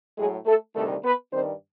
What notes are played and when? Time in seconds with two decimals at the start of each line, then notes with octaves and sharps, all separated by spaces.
0.18 A2 F#3 G#3 G#4
0.46 A3 A4
0.75 D2 C3 D#3 G3 A3 A4
1.03 B3 B4
1.32 G2 D#3 G3 C4 C5